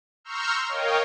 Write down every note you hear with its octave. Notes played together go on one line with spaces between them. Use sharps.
A#5 C6 C#6 E6 F6 G6
A#4 C#5 D#5 F5 G5